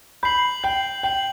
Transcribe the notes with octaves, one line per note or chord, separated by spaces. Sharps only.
B5 G6 C7 F#7
G5 G6 C7 F#7
G5 G6 C7 F#7